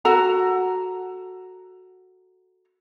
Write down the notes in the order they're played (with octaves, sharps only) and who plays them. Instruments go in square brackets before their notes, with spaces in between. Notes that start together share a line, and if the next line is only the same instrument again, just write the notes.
[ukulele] F#4 A4 A#5